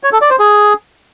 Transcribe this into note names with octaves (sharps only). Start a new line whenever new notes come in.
C#5
A4
D5
C5
G#4